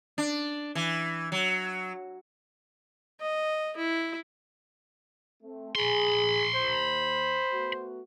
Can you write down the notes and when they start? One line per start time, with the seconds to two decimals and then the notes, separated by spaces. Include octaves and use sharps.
0.18 D4
0.75 E3
1.32 F#3
3.21 D#5
3.77 E4
5.43 A3 C4
5.75 G#4 B5 C6
6.55 D#2 C5
7.52 A3 B3 F#4